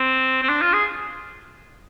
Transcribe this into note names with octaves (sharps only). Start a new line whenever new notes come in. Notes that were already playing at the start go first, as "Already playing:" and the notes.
Already playing: C4
C4
D4
F4
G#4